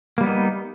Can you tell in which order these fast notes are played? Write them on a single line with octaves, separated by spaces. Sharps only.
A#3 G3 B3 D#4